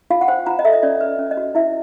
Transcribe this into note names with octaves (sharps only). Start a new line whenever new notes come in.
F4 F5
F#5
C5 G5
F4 A#5
D#5
A4 E5
D#5
C#4 D5
B4
C#4
D#5
F#4
E4 E5